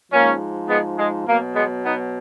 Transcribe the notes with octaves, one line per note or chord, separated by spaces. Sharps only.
G#2 F3 A#3 C#4
G#3 B3
G#3
B2 F#3 A#3
G#3 B3
B3 D#4